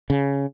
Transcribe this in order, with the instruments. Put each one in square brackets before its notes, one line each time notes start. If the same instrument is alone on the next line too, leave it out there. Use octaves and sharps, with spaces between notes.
[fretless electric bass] C#3